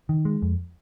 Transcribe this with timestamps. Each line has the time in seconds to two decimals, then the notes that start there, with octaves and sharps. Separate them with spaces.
0.09 D#3
0.25 G#3
0.42 F2